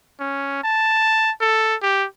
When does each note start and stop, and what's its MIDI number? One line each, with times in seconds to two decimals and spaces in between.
0.20 0.60 61
0.64 1.31 81
1.41 1.75 69
1.82 2.06 67